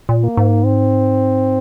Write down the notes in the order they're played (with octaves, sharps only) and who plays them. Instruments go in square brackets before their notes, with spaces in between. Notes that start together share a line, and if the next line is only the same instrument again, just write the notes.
[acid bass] A#2
[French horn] A#3
[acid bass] G#2
[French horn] C4